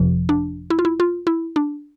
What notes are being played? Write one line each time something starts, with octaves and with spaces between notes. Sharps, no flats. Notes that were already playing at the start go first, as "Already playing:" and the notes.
Already playing: G1 F2 C3 F3
D4
E4
F4
E4
F4
E4
D4